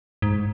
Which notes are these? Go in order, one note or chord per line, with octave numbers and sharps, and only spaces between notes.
G#2